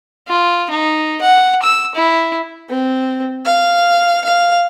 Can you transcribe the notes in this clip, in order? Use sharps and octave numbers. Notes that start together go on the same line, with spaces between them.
F4
D#4
F#5
E6
E4
C4
F5
F5